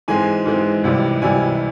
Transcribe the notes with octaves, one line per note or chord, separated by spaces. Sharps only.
G#2 E3 G#3 C4 G#5
G#2 E3 G#3 C4
C#2 C3 E3 G3
C#2 C3 E3 G3 G#5